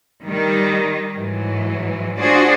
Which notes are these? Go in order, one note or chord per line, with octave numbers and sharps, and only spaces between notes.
D#3 G3
G#2 E3 F#3
D4 F4 F#4 G#4 C5 D5